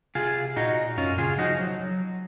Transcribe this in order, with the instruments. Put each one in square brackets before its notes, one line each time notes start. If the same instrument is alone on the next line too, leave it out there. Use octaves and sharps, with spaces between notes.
[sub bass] C3 [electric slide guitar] F4 G#4
[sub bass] A#2 [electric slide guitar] D#4 F#4
[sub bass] F#2 [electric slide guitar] C#4 F4
[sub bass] C#3 [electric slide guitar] F4 G#4
[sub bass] F3 [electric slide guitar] D#4 F#4
[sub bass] F3
F#3
F#3